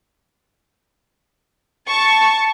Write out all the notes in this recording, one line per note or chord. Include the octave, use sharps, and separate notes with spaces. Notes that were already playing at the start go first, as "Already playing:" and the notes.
A5 C#6